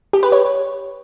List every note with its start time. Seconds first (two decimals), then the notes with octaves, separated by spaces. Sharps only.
0.13 G4
0.23 B4
0.32 C#5